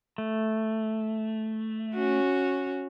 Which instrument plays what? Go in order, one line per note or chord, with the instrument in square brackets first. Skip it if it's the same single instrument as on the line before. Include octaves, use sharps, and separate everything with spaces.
[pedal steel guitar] A3
[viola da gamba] C#4 F#4